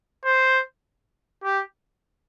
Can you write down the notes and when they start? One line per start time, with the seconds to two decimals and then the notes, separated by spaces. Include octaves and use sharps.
0.25 C5
1.44 G4